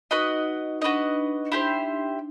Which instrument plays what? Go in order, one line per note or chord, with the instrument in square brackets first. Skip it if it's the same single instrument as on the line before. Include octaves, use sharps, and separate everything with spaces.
[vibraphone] D#4 [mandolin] F#4 B4 D#5
[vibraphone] D4 [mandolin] F#4 B4 D#5
[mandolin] E4 G4 C5